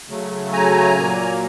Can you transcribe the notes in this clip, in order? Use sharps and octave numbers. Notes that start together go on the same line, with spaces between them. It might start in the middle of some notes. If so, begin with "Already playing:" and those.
C#3 F#3 A3
G#5 A#5
A#2 F#3 A#3